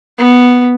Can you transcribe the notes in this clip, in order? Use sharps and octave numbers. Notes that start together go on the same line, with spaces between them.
B3